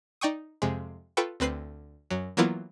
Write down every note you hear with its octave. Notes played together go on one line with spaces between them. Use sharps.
D#4 D5 G5 C#6 D#6
F2 C3 G#3
F4 A4 B4 G5 C#6
D2 C4 B4 F#6 C7
F#2 F#3
E3 F#3 A#3 B3 E4 F4